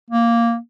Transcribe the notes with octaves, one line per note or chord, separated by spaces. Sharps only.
A#3